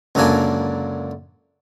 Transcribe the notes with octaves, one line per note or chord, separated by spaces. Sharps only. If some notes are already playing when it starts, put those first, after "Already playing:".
C#2 F#2 D3 A#3 D4 G#5